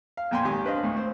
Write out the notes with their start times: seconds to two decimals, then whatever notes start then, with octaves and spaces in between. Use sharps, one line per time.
0.17 F5
0.31 F2 A#2 G5 G#5 C6
0.45 G#1 D#3 G4 G#5
0.65 D4 B4 C5 D#5 F5
0.83 D2 A2
0.97 C4